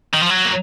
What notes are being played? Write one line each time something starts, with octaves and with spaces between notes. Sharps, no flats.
D#3
F3
F#3
A#3